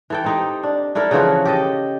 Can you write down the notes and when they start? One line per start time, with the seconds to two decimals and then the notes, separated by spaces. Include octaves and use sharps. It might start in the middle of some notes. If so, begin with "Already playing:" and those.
0.10 E3 A4 G5
0.24 C4 D#4 G4
0.63 D4
0.95 D4 E4 A4 A#4
1.11 C#3 E3 F3 F#4
1.45 G4 A4 D#5